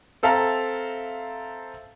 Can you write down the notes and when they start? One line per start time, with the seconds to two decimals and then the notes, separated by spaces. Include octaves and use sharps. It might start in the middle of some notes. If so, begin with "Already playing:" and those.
0.23 C4 A4 E5 F5 A5 A#5